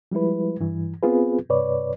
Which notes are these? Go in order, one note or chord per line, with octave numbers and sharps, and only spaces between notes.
F3 G3 G#3 E4 B4
G2 E3
B3 C4 F4 G#4 B4
G2 C3 B4 C#5 D5